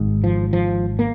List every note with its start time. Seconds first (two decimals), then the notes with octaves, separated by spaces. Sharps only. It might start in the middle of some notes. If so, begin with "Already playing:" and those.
Already playing: G#1 G#2
0.24 F3
0.53 F3
0.99 A#3